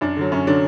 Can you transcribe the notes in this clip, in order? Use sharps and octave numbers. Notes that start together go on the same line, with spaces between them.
F#2 D4
D3 F#3
F#2 C#4
D3 F#3 D4